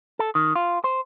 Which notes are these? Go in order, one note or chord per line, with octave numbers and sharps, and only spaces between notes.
A4
D#3
F4
C5